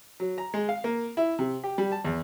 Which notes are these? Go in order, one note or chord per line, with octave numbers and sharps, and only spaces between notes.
F#3
A#5
G#3
F5
A#3
E4
C3
G4
G3
A5
E2